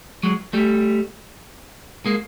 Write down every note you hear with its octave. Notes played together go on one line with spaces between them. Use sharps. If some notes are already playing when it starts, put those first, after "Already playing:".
F#3 G#3
G3 A3
G#3 A#3